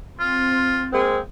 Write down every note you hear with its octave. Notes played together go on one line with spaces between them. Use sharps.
C4 F4
G#3 A#3 C4